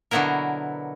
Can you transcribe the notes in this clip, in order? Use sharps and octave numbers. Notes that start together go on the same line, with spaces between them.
B2 D3 F#3 B3 E4 A#4